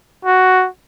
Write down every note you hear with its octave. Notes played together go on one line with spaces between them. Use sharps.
F#4